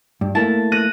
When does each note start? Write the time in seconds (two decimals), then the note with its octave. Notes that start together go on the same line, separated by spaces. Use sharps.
0.21 G2
0.35 A3 A#3 E4 A5
0.72 F#6 A#6 D#7